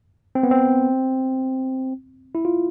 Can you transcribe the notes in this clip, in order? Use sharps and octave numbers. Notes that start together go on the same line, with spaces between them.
C4
B3
C4
E4
F4